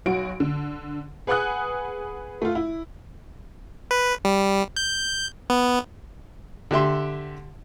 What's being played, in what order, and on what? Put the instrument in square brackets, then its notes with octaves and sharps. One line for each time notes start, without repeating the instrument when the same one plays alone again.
[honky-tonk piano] B1 F#4 D7
D3
G#4 B4 F#5 G#5 D#6 F#6
A3 F4
E4
[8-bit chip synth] B4
G3
G6
B3
[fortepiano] D3 G4 E5 C6